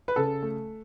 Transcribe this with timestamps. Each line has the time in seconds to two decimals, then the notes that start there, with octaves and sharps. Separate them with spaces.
0.08 B4
0.16 C#3 A4
0.43 A3